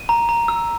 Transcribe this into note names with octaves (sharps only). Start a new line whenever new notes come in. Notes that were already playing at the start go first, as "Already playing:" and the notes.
Already playing: D#7
A#5
A#5
E6